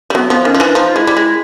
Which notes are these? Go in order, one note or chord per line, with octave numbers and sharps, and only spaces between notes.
G3
F#3 B3
F3 B3
D#3 C#4
F3
E3 D4
F3 D#4
F4
G#3 E4
G3
G#3 E4